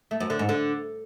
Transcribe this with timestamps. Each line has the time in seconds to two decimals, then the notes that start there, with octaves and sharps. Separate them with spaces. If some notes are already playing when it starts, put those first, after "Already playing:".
0.11 A3
0.20 F#2
0.30 D3
0.39 G#2
0.49 D3